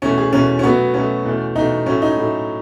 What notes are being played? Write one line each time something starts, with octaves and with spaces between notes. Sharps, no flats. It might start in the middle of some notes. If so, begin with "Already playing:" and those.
E2 B2 A3 C#4
G#4
E2 B2 A3 C#4
C#4
B2 F#3 A3 B3
B2 F#3 A3 C#4
E2 B2 A3
E2 B2 A3 D#4
A2 F#3 A3 C#4
D#4
A2 F#3 A3